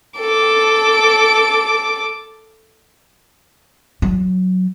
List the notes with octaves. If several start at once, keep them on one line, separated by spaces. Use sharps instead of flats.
A4 D6
F#3